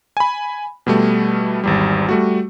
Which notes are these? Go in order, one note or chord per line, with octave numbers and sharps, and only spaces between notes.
G#5 B5
B2 G3 A3
G#1 E2 G3
G3 A3 F#4